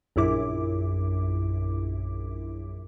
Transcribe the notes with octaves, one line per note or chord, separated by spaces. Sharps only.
A#1 F#2 E4 D6